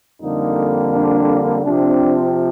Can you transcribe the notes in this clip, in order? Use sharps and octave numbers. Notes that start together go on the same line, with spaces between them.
F2 D3 G3 A#3 D#4
D4
C3 F3 C4 D4